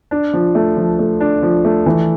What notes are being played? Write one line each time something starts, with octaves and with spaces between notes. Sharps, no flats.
D4
F3
A3
F3
A3
D4
F3
A3
E3